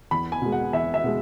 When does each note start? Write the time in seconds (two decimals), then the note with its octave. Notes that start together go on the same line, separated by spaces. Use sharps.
0.11 E2 B5
0.32 G#5
0.42 B2 G#3
0.52 F#5
0.73 E2 E5
0.94 E5
1.04 B2 G#3